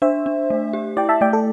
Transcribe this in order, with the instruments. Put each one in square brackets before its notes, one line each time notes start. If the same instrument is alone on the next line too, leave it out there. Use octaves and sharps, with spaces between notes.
[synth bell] D4 [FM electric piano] C5 E5
[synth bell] D4
A3
G4
[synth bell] E4 [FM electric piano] D5 G5
[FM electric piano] E5 A5
[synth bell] A3 [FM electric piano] D5 G5
[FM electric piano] A4 D5